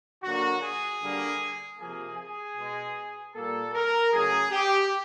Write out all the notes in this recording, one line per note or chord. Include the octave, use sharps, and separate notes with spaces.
D3 F#3 A#3 F#4
G#4
D3 G3 A#3
C3 F3 A#3 G#4
G#4
B2 G#3
A#2 G3 A#3 A4
A#4
C#3 F#3 A3 G#4
G4